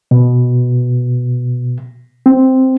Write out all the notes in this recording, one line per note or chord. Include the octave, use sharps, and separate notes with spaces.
B2
C4